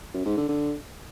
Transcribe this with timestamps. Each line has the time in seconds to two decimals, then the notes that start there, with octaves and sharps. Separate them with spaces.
0.14 F#2
0.26 G#2
0.37 D3
0.49 D3